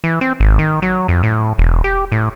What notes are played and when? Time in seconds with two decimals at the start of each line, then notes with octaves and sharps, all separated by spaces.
0.04 E3
0.21 C4
0.40 G#1
0.59 D#3
0.82 F#3
1.08 F2
1.23 A2
1.58 E1
1.84 G4
2.12 A2